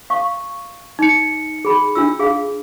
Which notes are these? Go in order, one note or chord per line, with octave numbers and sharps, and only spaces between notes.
F5 C#6
D#4 C#7
G#4 B5
D4 F4 E6
G#4 F5